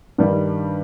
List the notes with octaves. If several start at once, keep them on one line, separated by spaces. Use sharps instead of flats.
G2 D#3 G3